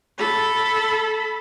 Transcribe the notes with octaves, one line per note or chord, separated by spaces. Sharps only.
A4 B5